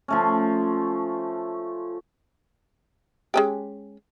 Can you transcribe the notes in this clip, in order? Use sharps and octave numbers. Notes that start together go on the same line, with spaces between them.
F3 A3 C#4
G#3 C#4 G4